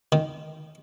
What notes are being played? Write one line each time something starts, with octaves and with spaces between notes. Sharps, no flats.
D#3